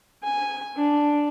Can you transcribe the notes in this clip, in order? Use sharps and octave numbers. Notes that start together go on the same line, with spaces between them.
G#5
D4